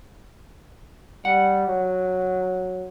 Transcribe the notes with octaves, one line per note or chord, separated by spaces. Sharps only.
G3 F#5
F#3